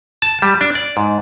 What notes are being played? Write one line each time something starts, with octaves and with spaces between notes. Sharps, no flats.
A5
G3
D4
D5
G#2